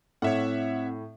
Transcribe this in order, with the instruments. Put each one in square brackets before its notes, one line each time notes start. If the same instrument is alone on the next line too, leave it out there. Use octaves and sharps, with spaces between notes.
[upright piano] A2 [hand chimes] C4 [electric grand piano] C#5 E5 F#5